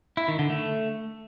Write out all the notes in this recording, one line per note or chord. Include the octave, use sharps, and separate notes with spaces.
E4
D#3
D3
A3